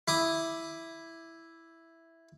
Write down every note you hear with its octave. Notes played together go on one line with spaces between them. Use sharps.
E4 D6 D#6